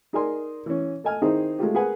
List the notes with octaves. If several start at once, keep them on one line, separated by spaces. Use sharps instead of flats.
D#4 G#4 A#4 D5 G#5 C6
E3 C#4
A4 D#5 G#5 F6
D#3 C4 D#4 E4 G#4 C5
G#3 A3 F4 G4
G#4 A#4 B4 F#5 G#5